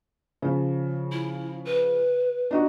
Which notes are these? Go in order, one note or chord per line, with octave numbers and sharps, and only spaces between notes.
C#3 F3
E4
B4
D4 D#4 F#4